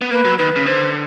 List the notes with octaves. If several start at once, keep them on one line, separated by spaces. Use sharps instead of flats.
B3
A#3 B4
F#3
D#3 B4
C#3
D3 C5